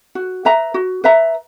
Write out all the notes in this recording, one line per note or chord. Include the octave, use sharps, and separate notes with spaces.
F#4
B4 E5 A#5
F#4
B4 E5 A#5